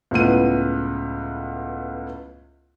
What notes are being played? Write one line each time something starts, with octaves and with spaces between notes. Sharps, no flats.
C#2 A2 B3 D#7